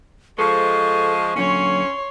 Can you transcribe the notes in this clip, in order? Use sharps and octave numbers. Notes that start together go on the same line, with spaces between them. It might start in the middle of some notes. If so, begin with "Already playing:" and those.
F3 G#3 A4 C5 C#6
A#2 D3 F#3 C#4 C#5 C6